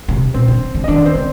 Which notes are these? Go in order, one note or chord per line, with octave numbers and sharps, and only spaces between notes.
C3
A#2 C4 C5
D3
D3
D#5
D#3 D4 D5
C4 C5
D3